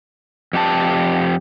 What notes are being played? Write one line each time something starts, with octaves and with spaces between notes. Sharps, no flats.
F2 G4 A5